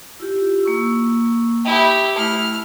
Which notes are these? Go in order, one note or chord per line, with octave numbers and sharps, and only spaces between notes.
E4 F4 G4
A#3 C#6 E6
E4 G4 G5 D#6
A3 E4 F6